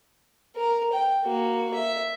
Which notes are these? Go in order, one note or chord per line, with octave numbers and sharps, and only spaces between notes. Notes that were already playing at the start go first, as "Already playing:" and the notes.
A#4
G5
A#3 F#4
E5